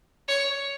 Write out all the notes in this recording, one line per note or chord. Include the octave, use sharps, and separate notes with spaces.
C#5